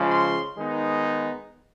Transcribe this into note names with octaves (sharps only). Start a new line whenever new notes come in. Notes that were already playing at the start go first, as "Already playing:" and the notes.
Already playing: C#3 F3 G#3
C6
D#3 G#3 B3 D#4